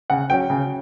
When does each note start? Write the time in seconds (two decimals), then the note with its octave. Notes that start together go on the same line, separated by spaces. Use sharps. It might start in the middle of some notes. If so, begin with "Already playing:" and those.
0.10 C#3 F#5
0.30 F#3 C#4 G5
0.50 C#3